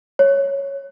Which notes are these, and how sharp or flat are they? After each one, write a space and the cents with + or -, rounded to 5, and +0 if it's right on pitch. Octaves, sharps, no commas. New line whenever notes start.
C#5 -5